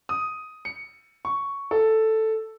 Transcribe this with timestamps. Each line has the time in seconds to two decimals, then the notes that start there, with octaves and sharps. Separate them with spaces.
0.09 D#6
0.65 C#7
1.25 C#6
1.71 A4